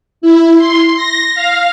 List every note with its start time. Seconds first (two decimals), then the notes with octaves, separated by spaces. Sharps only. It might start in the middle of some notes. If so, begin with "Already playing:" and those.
0.22 E4
0.57 C6
0.96 A#6
1.35 F5